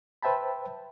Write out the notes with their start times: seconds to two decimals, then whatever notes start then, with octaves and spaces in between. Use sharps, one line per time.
0.22 B4 C5 E5 G5 A5 B5